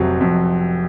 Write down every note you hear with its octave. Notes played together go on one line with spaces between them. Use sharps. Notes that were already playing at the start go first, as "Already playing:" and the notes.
Already playing: F1 F2 C3 F#3
F2